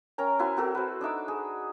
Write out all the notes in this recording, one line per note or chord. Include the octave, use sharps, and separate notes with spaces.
C#4 A#4 G5 A#5
E4 F#4 C5 G#5
C4 F#4 A4 A#4
B4 C5
D4 D#4 E5 D6
G#4